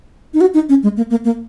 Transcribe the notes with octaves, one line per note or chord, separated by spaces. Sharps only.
D#4
F#4
D#4
C#4
G#3
A#3
A#3
A#3